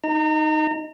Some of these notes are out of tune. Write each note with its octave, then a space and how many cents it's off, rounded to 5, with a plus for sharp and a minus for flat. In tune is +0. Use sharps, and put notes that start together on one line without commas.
D#4 +0 A#5 -35